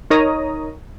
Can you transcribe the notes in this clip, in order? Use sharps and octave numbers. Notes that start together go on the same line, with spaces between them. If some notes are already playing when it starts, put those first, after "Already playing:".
D#4 A#4 C#5 A#5 D#6